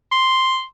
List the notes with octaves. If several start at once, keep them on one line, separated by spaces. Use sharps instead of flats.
C6